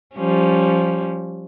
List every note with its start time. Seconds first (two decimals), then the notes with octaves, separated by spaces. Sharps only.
0.16 F3 G3 C#4